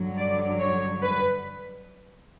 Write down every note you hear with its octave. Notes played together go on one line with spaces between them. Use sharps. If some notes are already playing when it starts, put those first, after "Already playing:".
Already playing: G2 D3 F#3
D5
C#5
B4